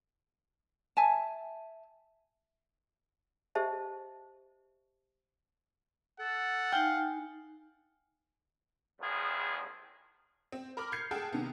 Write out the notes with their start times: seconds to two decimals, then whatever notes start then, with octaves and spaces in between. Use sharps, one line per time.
0.97 E5 G#5 A5
3.55 G4 C5 D#5 E5 A5
6.19 A4 F#5
6.72 D#4 F5 G5 G#5
9.00 A1 E2 D#3 F3 G#4
10.52 C4
10.77 A#4 A#5 B5 D6 F6
10.92 F6 G6 G#6 C7 C#7
11.11 G#4 A4 F#5 G5 A5
11.32 C3 D#3 B3